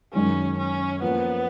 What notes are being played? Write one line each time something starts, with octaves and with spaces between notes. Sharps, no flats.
F#2 D#3 G#3 C#4
C#4
F3 A#3 B3 C#4